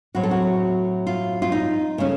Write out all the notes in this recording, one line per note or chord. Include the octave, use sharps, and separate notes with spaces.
A2 F#3 C4 F#4
A4
F#4
F4
F4
D#4
C#3 A3 C#4